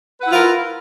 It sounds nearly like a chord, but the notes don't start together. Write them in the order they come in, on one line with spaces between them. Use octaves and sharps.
B4 F#5 E4 F4 A#4